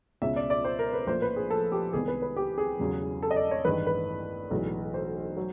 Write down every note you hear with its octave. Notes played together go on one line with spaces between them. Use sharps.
C#2 B2 G#3 C#4 E5
D5
D5
C5
A#4
B4
A#1 A2 F3 A#3 C5
B4
G#4
A4
G4
C2 C3 D#3 G#3 B3 G#4
B4
B4
G4
G#4
E1 E2 C#3 F#3
A4
D#5
D5
C#5
A1 G2 D#3 G#3 B4
B4
B1 A2 E3 G#3
C5
F#3